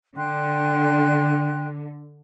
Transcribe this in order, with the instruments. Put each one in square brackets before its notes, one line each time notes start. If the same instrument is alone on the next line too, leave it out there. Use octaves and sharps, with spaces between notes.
[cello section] D3 [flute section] G5 C6 F#6